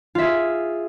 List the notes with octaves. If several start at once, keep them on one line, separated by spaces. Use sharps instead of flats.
F4 G#4 E5